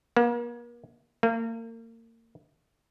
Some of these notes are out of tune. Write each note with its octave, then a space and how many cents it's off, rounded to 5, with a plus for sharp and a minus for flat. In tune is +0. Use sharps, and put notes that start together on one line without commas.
A#3 +40
A#3 -35